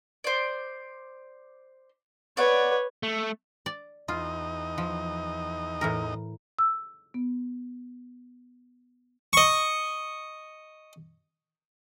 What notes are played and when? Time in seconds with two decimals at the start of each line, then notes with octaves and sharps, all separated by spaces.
0.24 C5 D5
2.37 B4 C#5 D5 F#5
3.03 A3
3.66 D5
4.08 E2 D#4 F4 D#5
4.78 F3
5.81 A2 E3 A#4
6.59 E6
7.14 B3
9.33 D#5 C#6